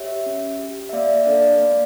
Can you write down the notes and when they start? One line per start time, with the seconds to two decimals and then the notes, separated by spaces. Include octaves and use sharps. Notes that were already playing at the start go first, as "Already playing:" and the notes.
Already playing: G4 C#5 E5
0.26 C#4
0.59 G4
0.89 E5
0.93 A#3 D5 F5
1.26 D4 A4 D5 F5
1.59 A#3